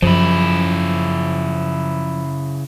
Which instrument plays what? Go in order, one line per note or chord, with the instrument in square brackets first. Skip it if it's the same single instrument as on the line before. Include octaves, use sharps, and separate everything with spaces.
[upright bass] F#2 [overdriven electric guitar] C#3 E4 [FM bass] F3